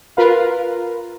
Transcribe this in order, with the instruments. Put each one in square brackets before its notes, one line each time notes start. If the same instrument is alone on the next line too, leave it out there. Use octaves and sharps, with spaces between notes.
[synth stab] F4 A#4 B4 F5